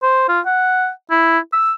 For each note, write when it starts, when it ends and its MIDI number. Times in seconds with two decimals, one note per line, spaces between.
0.03 0.24 72
0.29 0.40 65
0.46 0.89 78
1.10 1.39 64
1.53 1.73 88